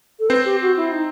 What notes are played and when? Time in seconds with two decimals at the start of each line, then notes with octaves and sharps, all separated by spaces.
0.20 A4
0.29 C4 B4 C5
0.45 G4
0.62 F#4
0.77 E4
0.92 D#4